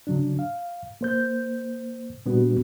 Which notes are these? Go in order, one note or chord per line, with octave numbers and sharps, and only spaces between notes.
C#3 F#3 D4
F5
A#3 C5 G6
A#2 G3 B3 D4 F#4